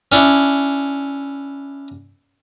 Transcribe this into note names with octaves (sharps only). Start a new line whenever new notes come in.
C#4 D4 E4